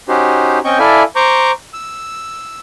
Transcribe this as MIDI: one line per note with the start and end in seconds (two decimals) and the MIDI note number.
0.08 0.59 61
0.08 0.59 63
0.08 0.59 66
0.08 0.59 67
0.08 0.59 72
0.65 0.79 60
0.65 0.79 61
0.65 0.79 75
0.65 0.79 79
0.65 0.79 85
0.65 0.79 91
0.79 1.03 64
0.79 1.03 69
0.79 1.03 74
0.79 1.03 76
0.79 1.03 77
0.79 1.03 80
1.16 1.51 72
1.16 1.51 82
1.16 1.51 85
1.16 1.51 86
1.16 1.51 91
1.73 2.60 88